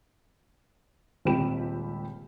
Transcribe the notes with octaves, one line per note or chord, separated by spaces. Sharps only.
D#1 C#2 C4 G4 B5 E7